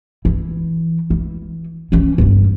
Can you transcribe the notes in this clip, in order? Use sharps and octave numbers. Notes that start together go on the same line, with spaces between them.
E3
E3
E3 C#4
G1 C#3